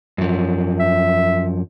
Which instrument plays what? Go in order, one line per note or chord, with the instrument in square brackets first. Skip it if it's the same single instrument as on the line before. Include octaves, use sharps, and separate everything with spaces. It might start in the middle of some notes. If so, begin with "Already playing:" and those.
[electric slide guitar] F#2 F3
[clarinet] E5